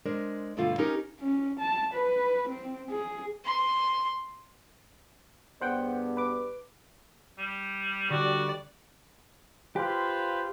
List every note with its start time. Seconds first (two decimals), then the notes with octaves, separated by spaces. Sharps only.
0.06 G#3 D4 A#4 C5
0.57 G2 B2 D3 A3 F4
0.78 C#4 D#4 G4 A#4
1.20 C#4
1.60 A5
1.93 B4
2.49 C4
2.90 G#4
3.45 C6
5.61 G2 B3 G#4 C5 D5 F#5 G5
6.17 B4 D6
7.38 G3
8.11 D3 G3 F#4 D5
9.76 F4 G4 B4 C5